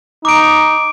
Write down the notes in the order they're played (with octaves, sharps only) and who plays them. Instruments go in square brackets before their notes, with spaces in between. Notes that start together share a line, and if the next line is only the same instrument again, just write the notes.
[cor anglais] D#4 [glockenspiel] D6 D7